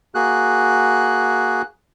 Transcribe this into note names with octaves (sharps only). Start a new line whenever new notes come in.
A#3 F#4 G#4 F#6